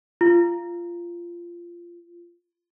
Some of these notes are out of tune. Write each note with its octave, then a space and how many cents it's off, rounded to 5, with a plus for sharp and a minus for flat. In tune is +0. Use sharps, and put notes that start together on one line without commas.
F4 -15